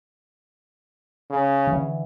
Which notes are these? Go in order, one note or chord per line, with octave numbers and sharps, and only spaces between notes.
C#3
D3 E3